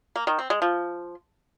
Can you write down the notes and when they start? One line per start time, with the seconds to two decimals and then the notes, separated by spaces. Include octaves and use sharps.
0.16 A#3
0.27 D#3
0.39 C4
0.50 G#3
0.62 F3